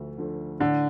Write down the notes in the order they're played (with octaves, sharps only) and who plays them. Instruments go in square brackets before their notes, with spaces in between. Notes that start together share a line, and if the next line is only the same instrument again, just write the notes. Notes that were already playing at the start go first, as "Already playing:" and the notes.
Already playing: [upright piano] D2 D3 F3 A3
D3 F3 A3
[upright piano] A2 [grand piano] D3